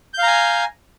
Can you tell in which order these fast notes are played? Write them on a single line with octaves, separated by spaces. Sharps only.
G6 F5 A#5 G#5